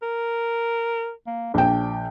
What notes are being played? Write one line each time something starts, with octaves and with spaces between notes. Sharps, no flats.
A#4
A#3
A#1 D4 G5